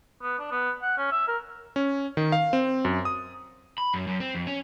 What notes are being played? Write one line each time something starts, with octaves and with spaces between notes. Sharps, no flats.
B3
D4
B3
F#5
C#4
E5
A#4
C#4
D#3
F5
C4
F#2
D#6
B5
F#2
F#2
C4
F2
C#4